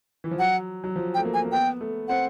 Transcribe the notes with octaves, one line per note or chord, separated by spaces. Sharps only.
E3
F3
F#3 F#5
F#3
F3
G5
A3
A#3
G#5
A#3
B3 G5
A3
C4 F#5